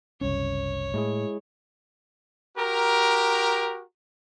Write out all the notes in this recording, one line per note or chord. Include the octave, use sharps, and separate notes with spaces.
F#1 C2 C#4 C#5
A2 G#3 E4 G#4
F#4 G4 A#4